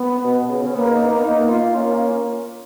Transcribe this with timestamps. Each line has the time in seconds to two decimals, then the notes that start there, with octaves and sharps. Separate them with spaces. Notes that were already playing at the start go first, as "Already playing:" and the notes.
Already playing: B3
0.24 B2
0.45 B2
0.49 C#3
0.67 C#4
0.75 A#3 B3
0.91 D#4
1.08 D#4
1.16 B3
1.24 A#3 D#4
1.49 F4
1.75 A#3 C#4
1.92 C#4